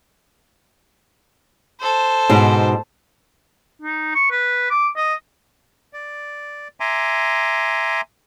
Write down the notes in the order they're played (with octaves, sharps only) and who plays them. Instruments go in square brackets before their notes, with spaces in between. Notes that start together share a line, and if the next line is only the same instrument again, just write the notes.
[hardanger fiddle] A4 C5
[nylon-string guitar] G#2 B2 D#4
[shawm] D#4
C#6
B4
D6
D#5
[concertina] D5
E5 G#5 A#5 C6 D6